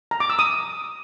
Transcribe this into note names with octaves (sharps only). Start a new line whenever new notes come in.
A#5
D6
E6
D#6